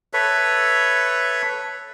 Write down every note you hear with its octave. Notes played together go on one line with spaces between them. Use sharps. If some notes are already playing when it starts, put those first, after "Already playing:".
A4 B4 C#5 E5